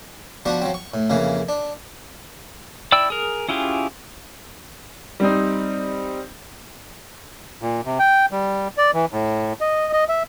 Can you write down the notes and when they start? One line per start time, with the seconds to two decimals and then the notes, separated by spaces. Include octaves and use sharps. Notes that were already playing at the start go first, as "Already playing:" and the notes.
0.46 F3 B3 D4 F#4
0.62 F3 F#3 C4
0.74 C#6
0.94 A2
1.10 F2 C#3 E3 A#3
1.49 D4
2.92 E4 D5 G5 E6
3.10 G#4 A#4
3.48 C#4 E4 F4 G4 G#4
5.20 G3 C4 D#4
7.62 A#2
7.85 C3
7.99 G5
8.31 G3
8.78 D5
8.94 E3
9.12 A2
9.61 D#5
9.93 D#5
10.09 E5